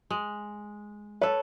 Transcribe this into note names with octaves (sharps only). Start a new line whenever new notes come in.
G#3
A4 B4 C#5